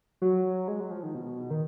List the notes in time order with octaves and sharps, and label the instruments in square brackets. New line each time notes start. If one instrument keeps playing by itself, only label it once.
[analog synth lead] F#3
G#3
F#3
F3
D#3
B2
D#3